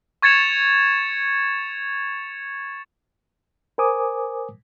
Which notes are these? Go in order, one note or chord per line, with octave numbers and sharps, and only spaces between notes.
C#6 G#6 A6 C#7 E7 F7
A#4 C5 G#5 D6 D#6